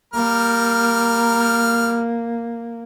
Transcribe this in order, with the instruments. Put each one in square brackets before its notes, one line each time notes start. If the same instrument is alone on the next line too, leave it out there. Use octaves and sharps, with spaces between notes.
[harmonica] G3 A#4 F6 [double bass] A#3